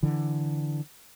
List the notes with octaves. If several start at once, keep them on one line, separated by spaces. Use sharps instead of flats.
D3 E3